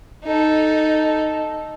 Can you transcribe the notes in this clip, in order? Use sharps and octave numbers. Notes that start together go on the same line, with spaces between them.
D#4 A4